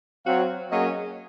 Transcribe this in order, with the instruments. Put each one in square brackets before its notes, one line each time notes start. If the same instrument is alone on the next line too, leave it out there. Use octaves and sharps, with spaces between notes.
[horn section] F#3 C4 F#4 C#5 F5
F#3 A#3 C#4 G#4 D#5